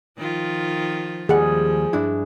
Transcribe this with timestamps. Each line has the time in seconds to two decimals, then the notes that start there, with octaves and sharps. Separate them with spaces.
0.18 D#3 F3 F4
1.29 D#2 F3 G3 G#4 F#5
1.93 G2 D4 E4